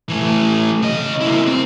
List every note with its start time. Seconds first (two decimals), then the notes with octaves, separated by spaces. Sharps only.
0.09 E3 A3
0.82 C#3 D#5
1.21 A#3 E4
1.47 C4